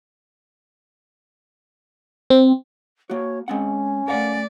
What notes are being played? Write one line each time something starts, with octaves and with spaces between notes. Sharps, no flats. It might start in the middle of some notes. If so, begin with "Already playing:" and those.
C4
A#3 F#4 C#5
G#3 C4 C#4 F#5
A3 A#4 D5 F5 F#5